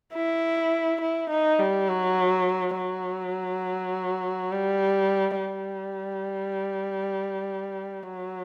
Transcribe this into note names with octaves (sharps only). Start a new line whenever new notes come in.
E4
E4
D#4
G3
F#3
F#3
G3
G3
F#3